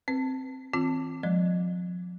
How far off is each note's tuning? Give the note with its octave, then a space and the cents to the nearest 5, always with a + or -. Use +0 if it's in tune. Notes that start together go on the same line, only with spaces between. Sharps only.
C4 +0 B4 +5
E3 -35 C4 +0 F4 +0
F3 +40 G#3 +0 D5 +0